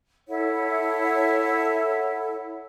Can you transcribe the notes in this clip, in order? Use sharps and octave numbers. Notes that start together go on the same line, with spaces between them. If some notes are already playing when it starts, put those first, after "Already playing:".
E4 A4 C#5 F#5